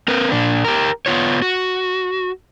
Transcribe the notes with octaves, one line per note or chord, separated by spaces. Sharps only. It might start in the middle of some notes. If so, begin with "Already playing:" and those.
C4 A#4 B4
A#2 D4
G4 A#4
B3 F4 C#5
F#4